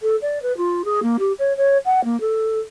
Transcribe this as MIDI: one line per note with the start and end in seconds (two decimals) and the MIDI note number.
0.01 0.16 69
0.22 0.39 74
0.42 0.55 71
0.57 0.82 65
0.84 1.00 68
1.02 1.17 58
1.19 1.32 67
1.39 1.53 73
1.57 1.77 73
1.85 2.03 78
2.04 2.19 58
2.20 2.59 69